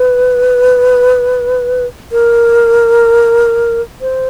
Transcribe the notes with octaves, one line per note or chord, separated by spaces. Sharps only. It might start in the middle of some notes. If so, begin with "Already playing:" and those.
Already playing: B4
A#4
C5